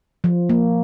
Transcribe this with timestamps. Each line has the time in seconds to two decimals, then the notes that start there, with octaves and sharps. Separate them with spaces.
0.24 F3
0.49 A#3